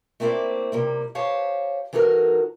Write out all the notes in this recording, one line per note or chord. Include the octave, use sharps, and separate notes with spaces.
A3 A#3 C4 E4 C5 D5
C3 G3 A#3
G4 C5 C#5 F5 A5
E3 D#4 F#4 A4 A#4